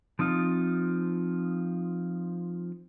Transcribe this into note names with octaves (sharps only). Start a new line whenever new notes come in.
F3 C4 D#4 F4